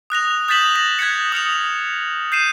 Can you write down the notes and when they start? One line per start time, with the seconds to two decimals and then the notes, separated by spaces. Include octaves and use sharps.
0.10 D#6 F#6 A#6 F7
0.48 D#6 G6 A6 B6 E7 F#7
0.76 A#6 F#7
0.99 F#6 G#6 A6 B6 C#7
1.32 D#6 F6 C#7 F7
2.32 G6 C7 D#7 E7